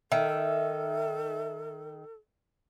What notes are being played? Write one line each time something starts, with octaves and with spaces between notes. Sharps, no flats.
D#3 A4 E5